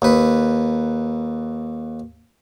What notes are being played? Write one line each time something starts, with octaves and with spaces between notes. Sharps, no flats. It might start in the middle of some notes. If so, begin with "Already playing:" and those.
D#2 B4